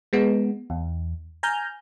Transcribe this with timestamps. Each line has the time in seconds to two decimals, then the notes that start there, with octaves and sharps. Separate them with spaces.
0.13 G#3 B3
0.70 E2
1.43 G#5 A#5 F6 G6